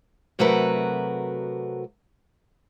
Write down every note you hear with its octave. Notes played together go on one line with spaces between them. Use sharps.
C3 F#3 A3 F#4 A#4 B4